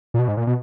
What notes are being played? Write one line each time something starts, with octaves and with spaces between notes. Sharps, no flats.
A#2
B2
G#2
A#2
B2